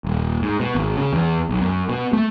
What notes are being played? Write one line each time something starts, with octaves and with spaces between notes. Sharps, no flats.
D#1
G#2
B2
G#1
C#3
E2
B1
F#2
B2
A3